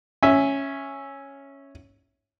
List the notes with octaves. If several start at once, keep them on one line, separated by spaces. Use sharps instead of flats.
C#4 E5